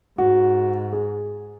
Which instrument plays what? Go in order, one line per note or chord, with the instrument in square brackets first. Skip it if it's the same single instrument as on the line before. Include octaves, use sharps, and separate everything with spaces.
[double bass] G#2 [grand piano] F#4
[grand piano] G#4